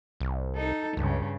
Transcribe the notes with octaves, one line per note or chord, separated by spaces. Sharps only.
C2
D#4 A4
C#2 G2 C#3